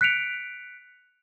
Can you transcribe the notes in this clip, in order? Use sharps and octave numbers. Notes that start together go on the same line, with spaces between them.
F#6 B6 C#7 D7 F7